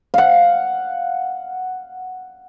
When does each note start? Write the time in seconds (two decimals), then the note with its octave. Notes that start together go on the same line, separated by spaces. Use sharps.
0.14 F5 F#5